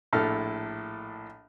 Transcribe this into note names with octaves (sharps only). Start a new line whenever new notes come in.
A#1 A2 A4 F6